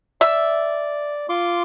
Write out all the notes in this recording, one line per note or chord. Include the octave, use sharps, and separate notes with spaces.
D5 E5
F4 C6 D6